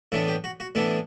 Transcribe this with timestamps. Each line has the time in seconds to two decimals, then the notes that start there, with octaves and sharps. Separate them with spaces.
0.12 A2 E3 B3 D4 E4
0.28 G4
0.44 F#4
0.60 F#4
0.75 A2 E3 B3 D4 E4